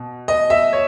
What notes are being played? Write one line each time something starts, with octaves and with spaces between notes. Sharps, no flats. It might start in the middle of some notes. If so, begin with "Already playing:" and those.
Already playing: B2
D#5
E5
C#5